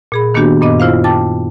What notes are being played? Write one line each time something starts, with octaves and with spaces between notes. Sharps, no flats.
A#2 G#4 B5
D#3 A#3 B3 D4 F#4 G4
F#2 A#2 B3 D#5 D6
E4 F4 C5 F5
G5 A5 D6 A6